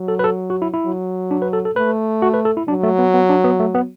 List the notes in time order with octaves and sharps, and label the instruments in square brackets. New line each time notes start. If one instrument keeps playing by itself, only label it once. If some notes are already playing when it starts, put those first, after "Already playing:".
Already playing: [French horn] F#3
[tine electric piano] A4
B4
A4
F#4
E4
E4
[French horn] F#3
[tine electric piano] D4
B4
A4
A4
[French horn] A3 [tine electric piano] B4
[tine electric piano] F#4
B4
A4
E4
[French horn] F#3 [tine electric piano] D4
[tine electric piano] A3
B3
B3
D4
B3
A3
B3